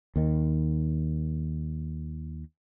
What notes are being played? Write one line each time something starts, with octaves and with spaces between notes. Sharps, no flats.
D#2 D#3